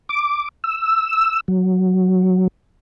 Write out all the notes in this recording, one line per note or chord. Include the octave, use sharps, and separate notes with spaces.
D6
E6
F#3